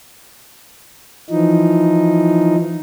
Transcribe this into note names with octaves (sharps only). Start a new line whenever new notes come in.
E3 F3 D#4